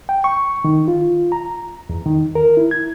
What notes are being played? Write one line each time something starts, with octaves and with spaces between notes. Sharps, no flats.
G5
C#6
D#3
F4
A#5
E2
D#3
A#4
E4
G#6